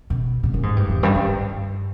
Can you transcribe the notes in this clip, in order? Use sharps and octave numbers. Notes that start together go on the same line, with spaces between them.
B2
B2
A#2
G#2
G2
E2
G2
G2